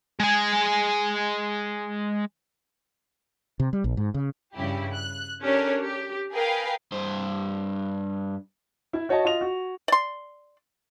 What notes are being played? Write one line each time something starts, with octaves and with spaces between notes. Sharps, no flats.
G#3 G#5
C3
G3
A#1
G#2
C#3
G2 C#3 E4 G4
F#6
C#4 D4 G4 A4 A#4 C#5
G4
G#4 A#4 B4 F5 G5
G2 C5
E4 E5
F#4 C#5 D#5 A5
F4 D#5 F7
F#4
D5 C6